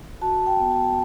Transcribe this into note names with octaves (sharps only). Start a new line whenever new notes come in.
F#4 A5
G5
B3
A5